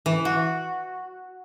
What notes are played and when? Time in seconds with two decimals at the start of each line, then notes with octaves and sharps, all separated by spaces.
0.06 E3
0.25 F#4